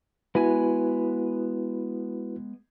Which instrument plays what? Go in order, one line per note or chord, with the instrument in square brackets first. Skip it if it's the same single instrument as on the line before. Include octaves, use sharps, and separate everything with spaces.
[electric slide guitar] G#3 B3 G#5 [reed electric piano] E4 F#4 B4